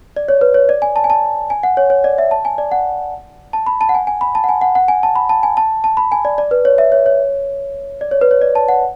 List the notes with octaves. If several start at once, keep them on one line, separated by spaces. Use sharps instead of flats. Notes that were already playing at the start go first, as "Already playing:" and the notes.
D5
C#5
B4
C#5
D5
G#5
A5
G#5
A5
G#5
F#5
C#5
C#5
D5
E5
A5
G#5
D5
F#5
A5
B5
A5
F#5
G#5
G#5
B5
A5
F#5
G#5
F#5
F#5
G#5
A5
B5
A5
G#5
A5
A5
B5
G#5
D5
D5
B4
C#5
E5
C#5
C#5
D5
C#5
B4
C#5
D5
A5
F#5